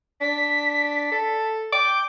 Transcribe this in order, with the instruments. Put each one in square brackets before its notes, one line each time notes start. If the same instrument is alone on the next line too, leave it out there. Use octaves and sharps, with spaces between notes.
[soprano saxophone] D4 [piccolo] B6
[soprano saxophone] A4
[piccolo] G5 [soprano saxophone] D6